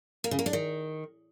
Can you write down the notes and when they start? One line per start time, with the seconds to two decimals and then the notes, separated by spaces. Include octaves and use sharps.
0.24 A#3
0.31 C#3
0.39 A#3
0.46 D4
0.53 D#3